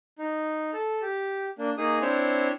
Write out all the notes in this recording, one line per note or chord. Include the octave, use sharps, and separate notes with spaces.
D#4
A4
G4
A#3 D4
A#3 D#4 G#4 D#6
C4 D4 E4 C5 C#5